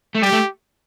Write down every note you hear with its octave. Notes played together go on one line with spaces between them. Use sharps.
A3
G3 G4
A3